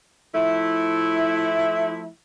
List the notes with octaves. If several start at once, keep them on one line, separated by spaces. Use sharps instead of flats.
F3 A3 E4